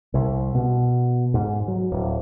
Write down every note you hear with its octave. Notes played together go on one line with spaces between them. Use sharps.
C2
B2
G#2
F#3
D1